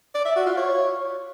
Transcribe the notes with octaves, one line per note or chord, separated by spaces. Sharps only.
D5
E5
F#4
F4
C#5